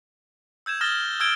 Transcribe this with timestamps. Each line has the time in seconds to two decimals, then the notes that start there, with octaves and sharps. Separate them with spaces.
0.66 E6 G6 G#6 E7
0.81 D#6 F6 A6 A#6 E7 G7
1.20 E6 F6 G6 G#6 D7 G7